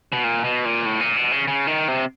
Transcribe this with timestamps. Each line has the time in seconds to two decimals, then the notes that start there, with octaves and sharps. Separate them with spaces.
0.12 B2
0.24 A#2
0.44 B2
0.65 A#2
0.85 A2
1.00 A#2
1.17 B2
1.32 C#3
1.48 C#3
1.67 D#3
1.88 C3